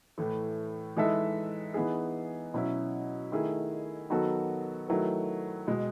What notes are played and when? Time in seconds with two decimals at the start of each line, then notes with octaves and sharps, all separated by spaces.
0.18 A2 E3 A3
0.97 E3 G#3 D#4 A4 E5
1.74 E3 B3 D#4 G#4
2.54 B2 F#3 C#4 E4
3.32 D#3 A3 E4 G#4
4.10 D#3 F#3 B3 F#4 A4
4.88 D#3 F#3 A3 E4 B4
5.67 B2 G#3